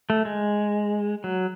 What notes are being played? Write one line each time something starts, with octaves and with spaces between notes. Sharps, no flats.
A3
G#3
F#3